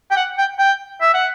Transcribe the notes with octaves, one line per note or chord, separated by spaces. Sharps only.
G5
F#5
G5
G5
E5
F#5